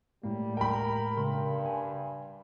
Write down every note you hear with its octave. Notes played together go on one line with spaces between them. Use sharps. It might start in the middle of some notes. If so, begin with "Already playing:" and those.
A2 G3 G#3 A#3
A#4 G5 B5
G2 C#3 A#4 C6
G#5